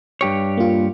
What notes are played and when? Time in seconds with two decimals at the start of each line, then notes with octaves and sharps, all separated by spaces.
0.21 G2 G4 C#5
0.57 A#3 F4